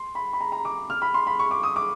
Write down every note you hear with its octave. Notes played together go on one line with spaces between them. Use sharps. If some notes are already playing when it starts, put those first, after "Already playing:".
Already playing: C6
B5
B5
A#5
A#5
D6
F6
B5
C6
B5
C#6
D6
D#6
D6